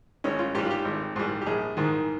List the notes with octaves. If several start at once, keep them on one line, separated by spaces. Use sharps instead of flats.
G#1 C#4
F4
G#2 G3 G4
F4
G4
G#1
G#2 G3
G4
A#1 G#4
G#2 D#3